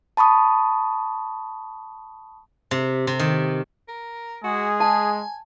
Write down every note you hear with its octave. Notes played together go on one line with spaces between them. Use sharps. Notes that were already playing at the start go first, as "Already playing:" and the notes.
A5 B5 C#6 D#6
C3
C3
D#3
A#4
G#3 F#4 G#4
G#5 A5